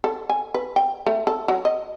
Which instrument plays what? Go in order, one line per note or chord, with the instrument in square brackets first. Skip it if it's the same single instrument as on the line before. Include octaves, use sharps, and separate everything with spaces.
[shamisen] A4
G#5
B4
G5
A3
A4
F#3
D#5